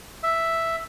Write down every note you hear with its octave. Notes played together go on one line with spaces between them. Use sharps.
E5